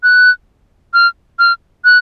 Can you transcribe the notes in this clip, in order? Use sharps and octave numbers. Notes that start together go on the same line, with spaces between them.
F#6
F6
F6
F#6